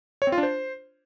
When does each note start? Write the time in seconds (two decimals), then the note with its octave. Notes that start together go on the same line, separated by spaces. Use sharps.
0.22 C#5
0.27 C4
0.32 F4
0.38 D4
0.43 C5